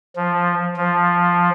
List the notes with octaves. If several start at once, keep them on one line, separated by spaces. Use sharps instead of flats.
F3
F3